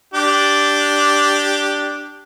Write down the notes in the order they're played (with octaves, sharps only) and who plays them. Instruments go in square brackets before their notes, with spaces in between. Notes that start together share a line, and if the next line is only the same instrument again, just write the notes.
[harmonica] D4 G4